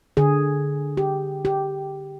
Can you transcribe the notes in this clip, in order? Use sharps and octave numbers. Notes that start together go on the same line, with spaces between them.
D3 G#4
G4
G4